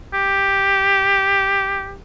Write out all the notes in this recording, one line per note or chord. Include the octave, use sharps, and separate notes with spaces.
G4